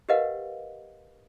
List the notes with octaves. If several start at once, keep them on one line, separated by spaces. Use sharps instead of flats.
G4 A#4 B4 D#5 F5 F#5